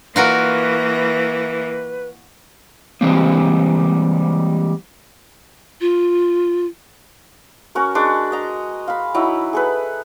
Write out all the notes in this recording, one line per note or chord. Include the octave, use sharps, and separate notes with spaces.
E3 A#3 F4 F#4 A#4 B4
E3 G3 G#3 A#3 C4
F4
C#4 F#4 A#4
G#3 D4 F#4
D#5 A#5
F5 B5
F#3 D#4 E4
G#4 A4 B4